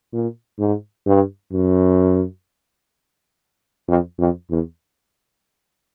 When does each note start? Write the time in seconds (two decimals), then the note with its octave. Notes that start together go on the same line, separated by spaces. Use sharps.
0.13 A#2
0.59 G#2
1.06 G2
1.53 F#2
3.88 F2
4.19 F2
4.50 E2